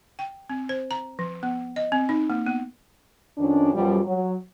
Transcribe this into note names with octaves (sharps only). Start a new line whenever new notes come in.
G5
C4
C5
A#5
F3
B3
D#5
C4
D#4
A#3
B3
F2 D#3 C#4 D4
F#2 B2 F3 G3
F#3